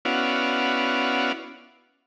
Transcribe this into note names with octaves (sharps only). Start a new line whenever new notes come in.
B3 C#4 E4 F#4 D5 F5